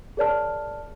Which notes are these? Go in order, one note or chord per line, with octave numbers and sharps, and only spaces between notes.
G#4 A#4 C#5 D5 A5 F6